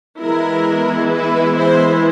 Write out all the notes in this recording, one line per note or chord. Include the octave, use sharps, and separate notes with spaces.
E3 G#3 B3 E4 A#4
B4
C5